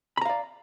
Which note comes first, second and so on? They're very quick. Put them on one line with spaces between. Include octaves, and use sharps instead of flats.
B5 A#5 F5 D5